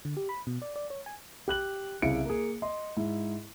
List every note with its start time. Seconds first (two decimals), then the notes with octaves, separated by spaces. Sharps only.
0.05 D3
0.17 G4
0.29 B5
0.47 B2
0.62 D5
0.76 D5
0.90 C#5
1.06 G#5
1.48 G4 F#6 F#7
2.02 C2 C#3 E4 F5 C#7 D7
2.25 A#3 G#4
2.62 D#5 C6
2.97 G#2 E4